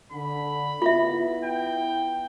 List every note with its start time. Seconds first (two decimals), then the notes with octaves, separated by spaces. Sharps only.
0.12 D3 B5
0.82 B3 E4 F4 E5
1.45 G5